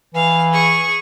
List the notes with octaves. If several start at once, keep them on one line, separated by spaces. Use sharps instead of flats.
E3 F5
G#4 C#6